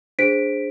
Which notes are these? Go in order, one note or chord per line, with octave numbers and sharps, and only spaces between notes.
D4 G#4 C5 B6 D7